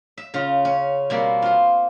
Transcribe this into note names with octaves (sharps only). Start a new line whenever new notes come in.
E5
C#3 F4
C#4
B2 G3 A#3 C4
F4 C5